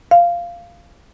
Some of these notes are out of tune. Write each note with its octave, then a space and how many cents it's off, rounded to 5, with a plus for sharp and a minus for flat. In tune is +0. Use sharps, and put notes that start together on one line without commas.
F5 -10